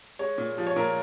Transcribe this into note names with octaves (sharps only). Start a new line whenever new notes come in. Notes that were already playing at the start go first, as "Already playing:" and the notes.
G#3 C#5
A#2
F3
C#5
A#2 A#4